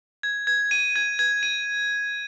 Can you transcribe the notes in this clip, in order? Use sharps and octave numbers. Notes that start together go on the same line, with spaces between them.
G#6
G#6
D#7
G#6
G#6
D#7